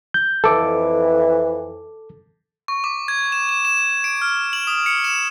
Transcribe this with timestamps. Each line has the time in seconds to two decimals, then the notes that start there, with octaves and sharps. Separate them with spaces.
0.14 G6
0.44 F2 E3 A4 D6
2.68 C#6
2.84 D6
3.08 G#6
3.32 E7
3.49 E7
3.65 E7
4.04 D7
4.22 F6
4.53 F#7
4.67 D#6
4.86 C#7
5.04 E7